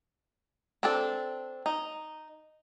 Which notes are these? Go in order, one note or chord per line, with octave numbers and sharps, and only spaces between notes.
C4 D4 A4
D#4